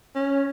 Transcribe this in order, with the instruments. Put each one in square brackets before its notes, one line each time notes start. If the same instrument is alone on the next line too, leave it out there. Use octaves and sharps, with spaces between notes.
[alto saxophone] C#4